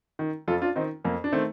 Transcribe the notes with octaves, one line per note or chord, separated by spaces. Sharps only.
D#3
F2 F4 A4
D4 F4
D#3 C4 D#4
F2 A#3
D4
D#3 A3 C4